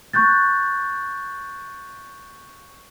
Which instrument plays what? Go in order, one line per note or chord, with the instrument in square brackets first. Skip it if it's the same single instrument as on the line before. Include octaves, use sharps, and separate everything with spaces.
[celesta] C#6 F#6 G6 A6